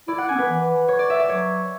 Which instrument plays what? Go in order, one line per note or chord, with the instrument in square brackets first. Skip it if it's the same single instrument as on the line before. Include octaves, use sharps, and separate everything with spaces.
[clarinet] E4 [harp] D5
[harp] F#5
[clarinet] C#4 [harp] G#5
[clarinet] B3
[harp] B4
[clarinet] E3
[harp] C#5
D5
E5
D5
[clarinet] F#3 [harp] C#5